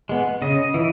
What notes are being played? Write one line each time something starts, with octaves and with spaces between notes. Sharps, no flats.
G#3 B3
C#3 D#5
E3